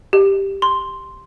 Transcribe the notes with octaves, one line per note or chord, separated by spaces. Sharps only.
G4
C6